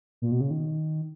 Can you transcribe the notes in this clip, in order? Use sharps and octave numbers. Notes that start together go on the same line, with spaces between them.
A#2
B2
C#3
D#3